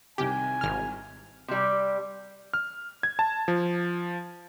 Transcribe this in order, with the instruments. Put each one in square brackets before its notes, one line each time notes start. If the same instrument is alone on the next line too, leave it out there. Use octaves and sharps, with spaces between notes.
[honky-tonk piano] C2 C3 D#3 [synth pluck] G4 [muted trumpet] G#5
[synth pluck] G#1 F6
[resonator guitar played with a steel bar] C3 G3
[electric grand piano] F6
G#6
A5
F3